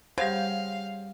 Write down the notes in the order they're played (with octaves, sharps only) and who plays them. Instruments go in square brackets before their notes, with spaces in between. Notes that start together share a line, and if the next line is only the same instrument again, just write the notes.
[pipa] C#3 [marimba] G3 G4 F#5 [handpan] C5 [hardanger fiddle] F5